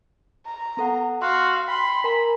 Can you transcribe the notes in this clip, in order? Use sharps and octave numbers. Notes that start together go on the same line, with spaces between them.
A#5
B3 A4 F#5
F#4 F5 C6
G5 B5 C6
A#4 G#5 A#5 B5